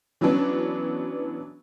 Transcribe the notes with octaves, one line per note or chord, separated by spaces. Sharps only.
E3 F#3 B3 C#4 D4